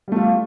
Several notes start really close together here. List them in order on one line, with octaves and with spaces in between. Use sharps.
G3 A3 F4